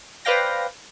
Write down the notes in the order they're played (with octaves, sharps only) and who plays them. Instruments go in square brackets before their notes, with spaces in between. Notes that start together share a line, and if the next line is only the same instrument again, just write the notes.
[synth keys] B4 C5 D5 F5 G5 A#6